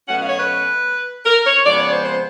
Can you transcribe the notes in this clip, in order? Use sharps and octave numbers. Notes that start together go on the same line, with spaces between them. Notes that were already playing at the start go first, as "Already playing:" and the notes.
B2 F#3 A3 C#4 F#5
F5
C#5
B4
A#4
C#5
F2 C#3 F3 G#3 B3 D5
C#5
C5
C5